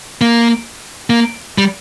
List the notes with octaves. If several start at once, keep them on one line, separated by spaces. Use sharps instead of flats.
A#3
A#3
G3